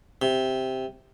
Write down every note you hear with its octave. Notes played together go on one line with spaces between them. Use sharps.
C3